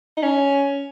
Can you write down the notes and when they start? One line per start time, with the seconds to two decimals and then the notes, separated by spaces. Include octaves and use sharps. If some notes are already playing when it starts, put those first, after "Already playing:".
0.17 D#4
0.23 C#4